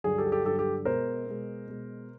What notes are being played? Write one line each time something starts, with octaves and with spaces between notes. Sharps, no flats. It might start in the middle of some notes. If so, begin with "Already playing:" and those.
G2 D3 F#3 G#4
G4 A4
G#4
G4 A4
G2 D3 F#3 G4 A4
G4 A4
B2 G#3 A#4 C5
B2 G#3
B2 G#3